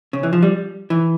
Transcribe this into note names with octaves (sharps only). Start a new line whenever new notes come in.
C#3
E3
F3
G3
E3